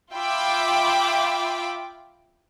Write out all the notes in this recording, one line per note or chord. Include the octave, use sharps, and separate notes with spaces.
F4 E5 G5 B5 D6